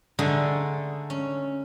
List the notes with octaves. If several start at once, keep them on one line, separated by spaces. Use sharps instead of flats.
D3 G#3 A3 D#4 G#4 F#5
C#4